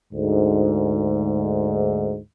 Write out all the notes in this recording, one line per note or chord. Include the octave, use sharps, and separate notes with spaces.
D2 G#2